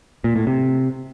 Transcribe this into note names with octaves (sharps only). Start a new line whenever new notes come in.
A#2
A2
C3